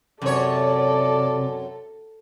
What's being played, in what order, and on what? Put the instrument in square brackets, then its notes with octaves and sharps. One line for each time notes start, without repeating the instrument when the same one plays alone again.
[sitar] F#2 C#5 [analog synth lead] C3 [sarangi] A4 [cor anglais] D5